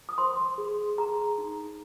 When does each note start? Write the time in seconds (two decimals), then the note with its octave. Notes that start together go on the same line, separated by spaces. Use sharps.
0.09 D#6
0.18 C5 C6
0.58 G#4
0.98 G#4 A#5
1.38 D#4